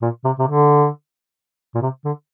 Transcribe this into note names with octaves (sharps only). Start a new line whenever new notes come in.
A#2
C3
C3
D3
A#2
C3
D3